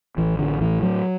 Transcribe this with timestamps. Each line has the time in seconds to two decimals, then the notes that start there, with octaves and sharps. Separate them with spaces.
0.17 A1 E3
0.39 D3
0.61 A2 E3
0.83 F#3